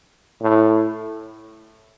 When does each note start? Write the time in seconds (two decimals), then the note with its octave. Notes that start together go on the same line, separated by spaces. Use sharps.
0.42 A2